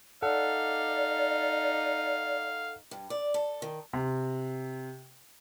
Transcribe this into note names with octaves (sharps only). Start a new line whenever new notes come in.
D#4 A4 D5 F5 F#5
G2
D5
A4
D#3
C3